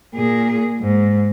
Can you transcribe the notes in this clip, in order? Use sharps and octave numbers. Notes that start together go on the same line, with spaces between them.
A#2 G#4
G#2